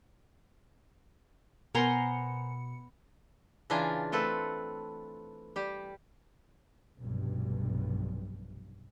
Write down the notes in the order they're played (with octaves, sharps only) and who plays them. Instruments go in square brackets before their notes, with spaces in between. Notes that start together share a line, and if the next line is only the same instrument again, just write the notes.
[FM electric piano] B2 C#7 [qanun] B3 A#5 C6 [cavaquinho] A#4 C5 G#5
[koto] C#3 E3 D4 F4 G#5 A#5
A3 C4 A4 B4
G3 G4
[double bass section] F1 B1 G2